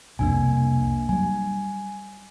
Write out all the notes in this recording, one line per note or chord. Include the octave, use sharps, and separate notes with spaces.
C2 F2 B2 A#3 D4 G#5
F#3 G3 G#5